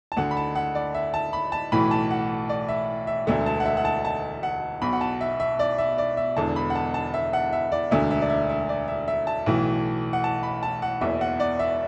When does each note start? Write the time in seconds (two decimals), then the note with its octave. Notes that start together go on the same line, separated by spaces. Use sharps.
0.12 A5
0.17 D2 D3 F#5
0.31 B5
0.37 A5
0.56 F#5
0.75 D5
0.94 E5
1.14 A5
1.33 B5
1.52 A5
1.72 B1 A2 E3 B5
1.91 A5
2.11 F#5
2.49 D5
2.69 E5
3.07 E5
3.27 E1 D2 D3 E5
3.46 A5
3.60 F#5
3.65 E5
3.77 F#5
3.85 A5
4.05 A5
4.43 F#5
4.82 B1 B2 B5
4.93 F#5
5.01 A5
5.21 E5
5.40 E5
5.59 D5
5.78 E5
5.98 D5
6.17 E5
6.37 E1 E2 D3 A5
6.56 B5
6.70 F#5
6.75 A5
6.94 A5
7.14 E5
7.33 F#5
7.53 E5
7.72 D5
7.91 E1 D2 D3 E5
8.11 E5
8.21 D5
8.30 E5
8.49 E5
8.69 D5
8.88 E5
9.08 E5
9.27 A5
9.46 B1 A2 E3
10.13 F#5
10.24 A5
10.43 B5
10.63 A5
10.82 F#5
11.01 F#1 E2 B2 E5
11.21 F#5
11.40 D5
11.59 E5